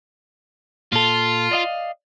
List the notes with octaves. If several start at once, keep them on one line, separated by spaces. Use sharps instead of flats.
A#2 F4 A4
D5 D#5 F5